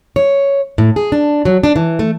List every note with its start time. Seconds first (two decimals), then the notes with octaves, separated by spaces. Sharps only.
0.16 C#5
0.78 A2
0.96 G#4
1.12 D4
1.45 F#3
1.64 D4
1.76 E3
1.99 A3